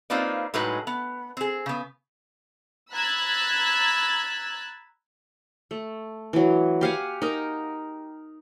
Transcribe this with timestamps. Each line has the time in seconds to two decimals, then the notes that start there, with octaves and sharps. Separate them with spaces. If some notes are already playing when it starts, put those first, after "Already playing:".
0.10 A#3 C4 D#4 F4 B4 D5
0.54 A2 F#3 G#3 D#4 B4
0.87 B3
1.37 C4 G#4
1.66 C#3 B3
2.93 A#5 B5 E6 F#6 G#6 A6
5.71 A3
6.33 E3 F#3
6.81 G4 F5 F#5 G#5
7.22 D#4 A#4